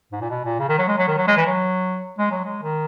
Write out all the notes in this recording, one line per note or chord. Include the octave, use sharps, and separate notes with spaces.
G#2
A#2
B2
A#2
C#3
D#3
F#3
G#3
F#3
D#3
F#3
G#3
E3
F#3
G#3
F#3
G#3
D#3